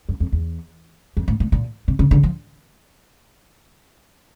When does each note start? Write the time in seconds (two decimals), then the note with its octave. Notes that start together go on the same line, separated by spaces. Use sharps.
0.09 F#2
0.20 F2
0.32 E2
1.17 F2
1.28 A2
1.40 A2
1.52 A#2
1.88 C3
1.99 C#3
2.11 D3
2.23 F3